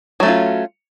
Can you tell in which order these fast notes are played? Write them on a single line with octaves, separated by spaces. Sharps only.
F#3 A3 C#4 F4